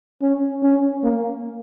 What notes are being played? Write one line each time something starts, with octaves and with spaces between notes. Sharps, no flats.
C#4
C#4
A#3